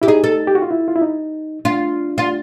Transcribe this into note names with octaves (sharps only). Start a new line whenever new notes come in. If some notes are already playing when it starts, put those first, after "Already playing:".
E4 G4
D#4 G#4
A4
G4
F#4
F4
E4
F4
E4
D#4
D4 F4
F4